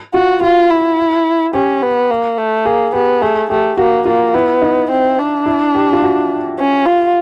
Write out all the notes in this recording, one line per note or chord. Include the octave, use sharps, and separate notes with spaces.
F4 F#4
F4 F#4
E4
C#4 G4
B3
A#3
A3
A#3 G#4
B3 G4
A3 G#4
A3 G4
A#3 F#4
A#3 F4
B3 E4
D#4
C4
D4
E4
G4
F4
F#4
C#4
F4